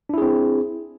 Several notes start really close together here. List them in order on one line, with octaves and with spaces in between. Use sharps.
D4 E4 G#4 C4